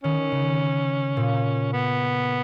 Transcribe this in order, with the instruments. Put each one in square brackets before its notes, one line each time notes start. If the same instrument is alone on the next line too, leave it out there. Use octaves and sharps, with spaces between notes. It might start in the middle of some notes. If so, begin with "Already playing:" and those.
[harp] D#3 [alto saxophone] C#4
[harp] C#3
A#2
[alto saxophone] B3